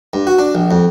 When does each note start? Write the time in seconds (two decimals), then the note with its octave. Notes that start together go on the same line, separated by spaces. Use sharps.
0.13 G2
0.27 F#4
0.39 D4
0.55 A#1
0.71 F2